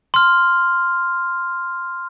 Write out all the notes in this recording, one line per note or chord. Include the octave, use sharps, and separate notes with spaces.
C6 F6